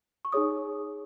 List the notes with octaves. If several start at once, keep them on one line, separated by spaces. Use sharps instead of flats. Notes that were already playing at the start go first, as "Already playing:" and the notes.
C#6
D#4 G#4 C#5 D#6